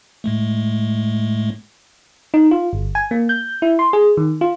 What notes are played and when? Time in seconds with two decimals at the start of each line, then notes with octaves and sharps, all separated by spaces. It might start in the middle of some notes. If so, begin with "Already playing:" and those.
0.24 A2 G#3 A3
2.34 D#4
2.51 F4
2.73 G1
2.95 G#5
3.11 A#3
3.29 G6
3.62 E4
3.79 C6
3.93 G#4
4.17 D#3
4.41 F4